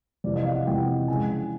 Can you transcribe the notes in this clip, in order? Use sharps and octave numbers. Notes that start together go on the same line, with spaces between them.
F2 C3 E3 D5
D#5
F5
F#5
F2 C3 E3 G5
C#3 E3 G#3 G#5